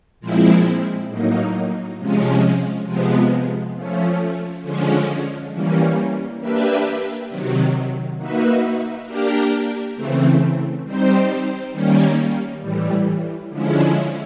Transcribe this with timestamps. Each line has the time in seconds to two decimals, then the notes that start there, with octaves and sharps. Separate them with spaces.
0.20 A#2 F3 G#3 C4 E4
1.09 A2 F#3 A#3 D#4
1.98 C3 F3 G#3 C#4
2.87 C3 F3 G#3 B3
3.75 F3 A3 C#4
4.63 D3 F3 G#3 C#4
5.53 E3 G3 A#3 C#4
6.41 A#3 D4 G4 B4 E5
7.29 C3 D#3 F#3
8.17 A#3 D#4 F#4 B4 E5
9.07 A#3 D4 G4 A#4
9.95 C#3 E3 A3 C4
10.84 G3 C4 D#4 G4 C5
11.72 D#3 G3 A#3 C#4
12.61 A2 E3 G3
13.50 D3 F3 G#3 C#4 E4